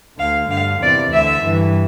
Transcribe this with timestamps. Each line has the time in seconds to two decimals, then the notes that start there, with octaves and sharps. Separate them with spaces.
0.19 D2 D3 F5
0.50 G2 D3 F5
0.82 E2 C3 E3 D5
1.13 D2 D3 E5
1.44 G2 E3